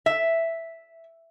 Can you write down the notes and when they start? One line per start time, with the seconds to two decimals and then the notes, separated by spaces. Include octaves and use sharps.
0.06 E5